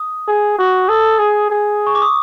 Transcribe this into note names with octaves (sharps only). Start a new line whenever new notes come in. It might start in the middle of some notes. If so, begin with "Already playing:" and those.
Already playing: D#6
G#4
F#4
A4 D#6
G#4
G#4
C#6
D6
D#6